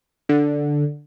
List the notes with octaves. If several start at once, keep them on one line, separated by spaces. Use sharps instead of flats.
D3